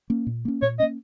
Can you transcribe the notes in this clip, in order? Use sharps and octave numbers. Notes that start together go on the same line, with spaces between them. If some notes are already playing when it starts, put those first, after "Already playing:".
A#3 C#4
A#2
A#3 C#4
A#2 C#5
A#3 C#4 D#5